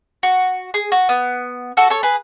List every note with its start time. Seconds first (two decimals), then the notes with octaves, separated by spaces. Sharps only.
0.23 F#4
0.74 G#4
0.92 F#4
1.09 B3
1.77 F#4 A4
1.90 A4 C#5
2.03 G#4 B4